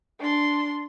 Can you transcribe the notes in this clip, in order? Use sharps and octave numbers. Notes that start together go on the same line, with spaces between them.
D4 C6